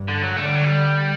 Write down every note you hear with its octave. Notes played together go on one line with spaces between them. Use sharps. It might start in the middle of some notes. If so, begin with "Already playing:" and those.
Already playing: G2
D3
F#3
D3 A3
G3
F#3
G3